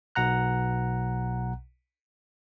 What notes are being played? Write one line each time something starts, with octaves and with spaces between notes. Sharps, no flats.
B1 B2 F#5 A#5 F#6